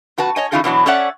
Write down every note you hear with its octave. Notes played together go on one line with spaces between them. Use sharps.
F2 F#4 B4 A5
C#5 D#5 G#5
E3 C#4 D#4 F4 G#4 A4
B2 E3 F#3 D4
C#4 A4 C#5 D5 E5 F#5